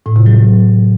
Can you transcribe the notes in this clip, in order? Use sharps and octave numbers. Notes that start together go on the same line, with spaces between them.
A2
C3
F#3